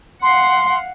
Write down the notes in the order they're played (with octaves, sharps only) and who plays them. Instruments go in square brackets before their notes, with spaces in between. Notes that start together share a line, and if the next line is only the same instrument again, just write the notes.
[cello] F5 F#5 [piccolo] C6